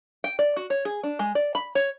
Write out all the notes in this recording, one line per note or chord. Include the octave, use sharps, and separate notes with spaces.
G5
D5
F#4
C#5
G#4
D4
G#3
D5
B5
C#5